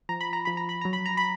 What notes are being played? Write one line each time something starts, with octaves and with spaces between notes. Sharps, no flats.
F3 A#5
B5
A#5
F3 B5
A#5
B5
F#3 A#5
B5
A#5
B5